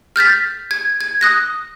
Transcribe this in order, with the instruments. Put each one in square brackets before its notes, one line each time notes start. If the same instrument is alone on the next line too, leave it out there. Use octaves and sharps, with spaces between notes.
[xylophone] F6 G6 A6 B6
G#6
G#6
D#6 F#6 A#6